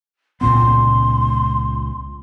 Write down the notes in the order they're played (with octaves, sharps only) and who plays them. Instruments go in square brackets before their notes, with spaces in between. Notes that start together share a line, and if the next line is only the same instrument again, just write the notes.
[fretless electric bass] C#2 A#2 B3 [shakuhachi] C6